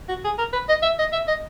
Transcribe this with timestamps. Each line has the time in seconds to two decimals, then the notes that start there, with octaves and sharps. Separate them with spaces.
0.09 F#4
0.25 G#4
0.38 A#4
0.53 B4
0.69 D#5
0.83 E5
0.99 D#5
1.13 E5
1.28 D#5